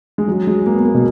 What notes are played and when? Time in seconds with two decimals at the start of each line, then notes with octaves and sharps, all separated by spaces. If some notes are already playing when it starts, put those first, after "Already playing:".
0.18 G#3
0.28 F#3
0.47 G#3
0.66 A#3
0.75 B3
0.85 A#3
0.94 B2